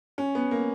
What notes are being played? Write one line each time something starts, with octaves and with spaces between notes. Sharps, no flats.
C#4
B3
A#3